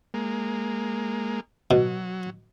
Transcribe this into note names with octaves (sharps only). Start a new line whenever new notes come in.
G#3 A#3
B2 F#3